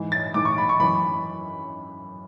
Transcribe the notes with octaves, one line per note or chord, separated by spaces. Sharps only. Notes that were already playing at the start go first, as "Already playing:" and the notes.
Already playing: G#2 E3
A6
G#2 E3 D6
C#6
B5
C#6
F#2 E3 B5